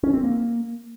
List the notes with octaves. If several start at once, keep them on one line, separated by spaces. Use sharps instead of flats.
C#4
C4
A#3